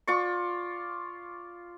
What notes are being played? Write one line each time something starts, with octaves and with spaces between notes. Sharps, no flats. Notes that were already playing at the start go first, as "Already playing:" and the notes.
F4 D5 C#6